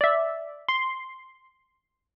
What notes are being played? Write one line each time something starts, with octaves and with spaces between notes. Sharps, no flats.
D5 E5
C6